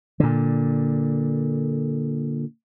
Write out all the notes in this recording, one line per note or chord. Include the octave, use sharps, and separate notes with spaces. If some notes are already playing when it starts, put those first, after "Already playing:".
A#2 D3